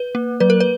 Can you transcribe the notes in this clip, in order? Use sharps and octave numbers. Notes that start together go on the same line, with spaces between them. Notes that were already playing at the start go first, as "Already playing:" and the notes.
Already playing: B4
A#3
F#3 B4
A#4
B4